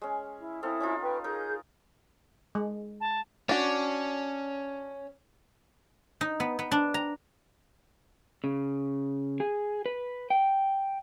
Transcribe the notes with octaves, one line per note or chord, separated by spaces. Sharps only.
G#3 C#4
E4
C4 E4 A4 F5 D#6
C#4 D#4 F4
B4 G5 C#6
D#4 G#4 A#4 G6
G#3
A5
C#4 D4 F#4
D#4
B3
B3
D4
A#5
C#3
G#4
B4
G5